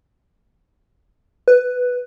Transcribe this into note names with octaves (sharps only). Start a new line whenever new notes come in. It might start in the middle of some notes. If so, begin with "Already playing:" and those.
B4